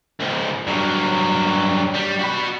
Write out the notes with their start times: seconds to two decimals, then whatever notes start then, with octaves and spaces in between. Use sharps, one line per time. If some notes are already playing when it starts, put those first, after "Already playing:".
0.20 C#2 G#2
0.67 G2 F#3
1.94 G3
2.19 F#4 B5